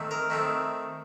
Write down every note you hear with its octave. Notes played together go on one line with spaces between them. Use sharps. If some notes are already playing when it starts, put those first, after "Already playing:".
Already playing: D#3 A3 C4
A#4
D#3 A3 C4